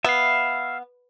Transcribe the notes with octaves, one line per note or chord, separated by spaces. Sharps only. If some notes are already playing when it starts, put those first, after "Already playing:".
B3 E5 F5